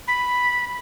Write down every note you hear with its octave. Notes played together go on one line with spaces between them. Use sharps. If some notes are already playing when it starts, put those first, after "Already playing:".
B5